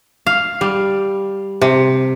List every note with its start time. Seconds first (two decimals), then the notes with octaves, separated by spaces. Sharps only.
0.27 F5
0.61 G3
1.61 C3